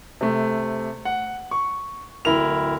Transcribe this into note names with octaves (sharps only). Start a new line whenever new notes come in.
C3 A3
F#5
C#6
D1 E4 A#4 F7